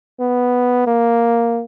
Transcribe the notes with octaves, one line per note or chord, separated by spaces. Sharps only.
B3
A#3